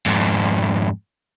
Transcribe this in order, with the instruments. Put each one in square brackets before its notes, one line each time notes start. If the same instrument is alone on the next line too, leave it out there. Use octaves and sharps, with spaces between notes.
[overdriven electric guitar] F2 G#2